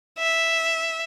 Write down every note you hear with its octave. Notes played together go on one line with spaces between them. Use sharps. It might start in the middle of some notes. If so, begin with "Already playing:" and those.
E5